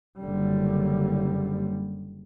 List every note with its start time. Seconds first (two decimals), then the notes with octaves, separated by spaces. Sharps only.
0.20 F#1 D3 G3